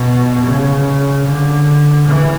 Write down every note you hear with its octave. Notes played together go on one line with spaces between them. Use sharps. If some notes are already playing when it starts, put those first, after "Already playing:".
Already playing: B2
C#3
D3
E3